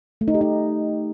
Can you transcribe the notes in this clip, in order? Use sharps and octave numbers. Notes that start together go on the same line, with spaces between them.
A3
D#4
G4
D#4